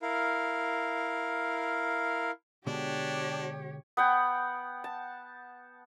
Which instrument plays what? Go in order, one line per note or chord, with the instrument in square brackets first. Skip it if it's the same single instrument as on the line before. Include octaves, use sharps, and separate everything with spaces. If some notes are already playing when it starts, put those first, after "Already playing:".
[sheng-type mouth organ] E4 A#4 F5
[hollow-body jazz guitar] B2 D3 G#3 [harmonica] D4 [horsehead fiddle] G4 C#5
[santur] B3 F#5 G5
A5